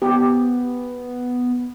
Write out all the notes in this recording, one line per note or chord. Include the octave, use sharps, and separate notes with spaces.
B3 G4